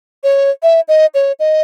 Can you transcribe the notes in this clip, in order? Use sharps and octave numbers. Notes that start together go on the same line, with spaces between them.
C#5
E5
D#5
C#5
D#5